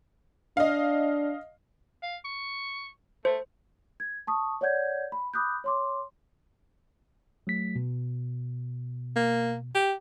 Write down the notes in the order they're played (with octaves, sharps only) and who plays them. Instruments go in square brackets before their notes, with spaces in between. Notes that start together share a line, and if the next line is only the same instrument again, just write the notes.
[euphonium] D4 [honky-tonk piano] D#5 F5
[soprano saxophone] F5
C#6
[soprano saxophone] A3 [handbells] C5
[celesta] G#6
A5 C#6 D#6
C#5 D5 F#5 G6 G#6
B5
B5 D6 D#6 F#6 G6
C#5 C6 D6
[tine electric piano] F#3 A3 B6
B2
[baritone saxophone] A#3
G4